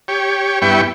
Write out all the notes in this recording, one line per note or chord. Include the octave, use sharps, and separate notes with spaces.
G4 C#5
G2 B3 E4 G5 C#6